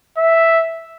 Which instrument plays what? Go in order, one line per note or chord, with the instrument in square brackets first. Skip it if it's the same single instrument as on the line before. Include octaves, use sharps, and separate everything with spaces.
[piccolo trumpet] E5